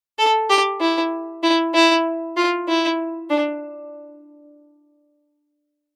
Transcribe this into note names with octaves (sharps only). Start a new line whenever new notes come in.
A4
G4
E4
E4
E4
F4
E4
D4